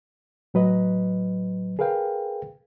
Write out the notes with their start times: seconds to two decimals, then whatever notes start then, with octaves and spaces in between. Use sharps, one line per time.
0.54 A2 F#3 B4 D#5
1.79 G#4 A#4 B4 F5 G5